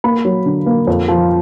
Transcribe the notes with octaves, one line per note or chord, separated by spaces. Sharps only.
A#3 B5
F#3
D3
A#3
F2
F3